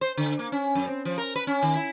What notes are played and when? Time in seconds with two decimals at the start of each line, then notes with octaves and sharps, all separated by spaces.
0.01 C5
0.17 D3
0.39 A#3
0.52 C#4
0.75 F#2
0.87 C4
1.05 F3
1.18 A#4
1.36 B4
1.47 C#4
1.62 D#3
1.75 E4